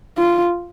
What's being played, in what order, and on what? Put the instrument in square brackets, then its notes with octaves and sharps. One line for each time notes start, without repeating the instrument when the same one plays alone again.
[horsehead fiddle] F4